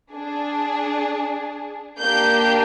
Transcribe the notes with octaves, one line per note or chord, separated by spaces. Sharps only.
D4 G#4
A#3 D4 G4 G6